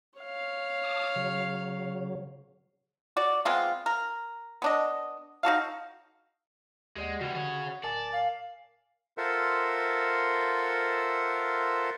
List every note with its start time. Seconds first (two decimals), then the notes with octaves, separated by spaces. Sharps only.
0.19 C#5 F5
0.84 A5 D6 D#6
1.16 C#3 F#3
3.17 F#4 D5
3.45 G#3 B3 C4 F4
3.86 A#4
4.62 B3 D4 D#5
5.43 D#4 F#4 A4 F5
6.96 D#2 G#3 G4 D5 F#5
7.21 C#3 E3 G3 F#4 F#5
7.35 D3 G#4 C#5
7.84 D1 A#4 D5 G#5 A5
8.12 F5
9.18 F4 A4 A#4 C5 E5 F#5